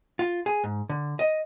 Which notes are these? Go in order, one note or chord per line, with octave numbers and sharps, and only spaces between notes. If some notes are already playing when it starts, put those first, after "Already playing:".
F4
G#4
G#2
D3
D#5